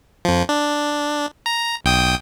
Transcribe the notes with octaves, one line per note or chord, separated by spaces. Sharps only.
F2 F3
D4
A#5
B1 G5 D#6